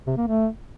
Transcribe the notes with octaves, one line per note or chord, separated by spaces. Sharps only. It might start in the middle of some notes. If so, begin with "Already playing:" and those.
C3
A#3
A3